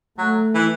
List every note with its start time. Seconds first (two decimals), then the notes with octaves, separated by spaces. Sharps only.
0.18 F#3 A3
0.55 E3